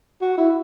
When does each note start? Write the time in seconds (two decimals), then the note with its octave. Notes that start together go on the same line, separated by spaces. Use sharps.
0.21 F#4
0.37 E4